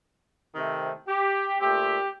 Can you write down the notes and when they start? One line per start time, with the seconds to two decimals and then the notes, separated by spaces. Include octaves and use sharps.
0.55 C3 D#3 A3 C4
1.08 G4
1.60 A#2 A3 C4 G4